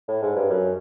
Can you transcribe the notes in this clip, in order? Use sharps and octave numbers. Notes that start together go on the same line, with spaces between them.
A2
G#2
G2
F#2